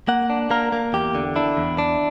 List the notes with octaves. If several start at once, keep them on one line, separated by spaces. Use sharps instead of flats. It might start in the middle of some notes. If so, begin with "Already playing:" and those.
A#3 F#5
D4
A#3 A#4
A#3
E2 G4
D3
D4 E4
E2
D4